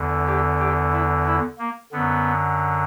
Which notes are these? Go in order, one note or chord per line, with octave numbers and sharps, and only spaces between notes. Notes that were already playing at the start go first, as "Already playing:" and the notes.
Already playing: E2 D3
G4
G4
E4
E4
A#3
F#2 D3 B3